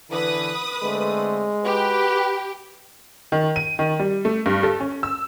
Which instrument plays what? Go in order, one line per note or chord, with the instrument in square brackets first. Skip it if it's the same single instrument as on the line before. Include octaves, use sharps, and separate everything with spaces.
[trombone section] D3 E3 [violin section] B4 D#6
[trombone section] D3 A3 C4 [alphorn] G#3
[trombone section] F#4 B4 [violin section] G4
[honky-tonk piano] D#3
D#7
D#3
G3
A3
G2
A4
C#4
E6